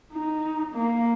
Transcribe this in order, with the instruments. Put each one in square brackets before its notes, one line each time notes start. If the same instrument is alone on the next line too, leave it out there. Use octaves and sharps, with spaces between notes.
[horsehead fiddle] D#4
A#3